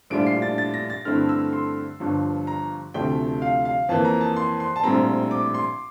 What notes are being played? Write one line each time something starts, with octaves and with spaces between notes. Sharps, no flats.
A#1 A2 G3 D4 F4 D7
C7
A6
A6
A#6
A6
G2 D3 A3 C4 E4 F6
E6
C6
G1 G2 F3
A#5
D2 C3 F3 A3 G5
F5
F5
F2 E3 A#3 A5
A#5
A5
C6
C6
A5
A#1 A2 G3 C4 A#5
D6
C6